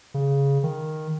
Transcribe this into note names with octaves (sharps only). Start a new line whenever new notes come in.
C#3
D#3